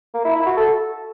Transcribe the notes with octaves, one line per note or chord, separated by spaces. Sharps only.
A#3
E4
E4
F#4
A4